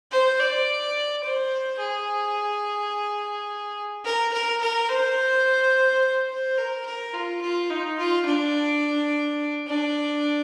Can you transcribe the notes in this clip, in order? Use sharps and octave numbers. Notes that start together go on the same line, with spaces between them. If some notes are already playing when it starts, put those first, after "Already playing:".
C5
D5
C5
G#4
A#4
A#4
A#4
C5
C5
A#4
A#4
F4
F4
D#4
F4
D4
D4